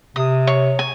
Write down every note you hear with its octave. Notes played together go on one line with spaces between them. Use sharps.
C3 D#6
C#5
G#5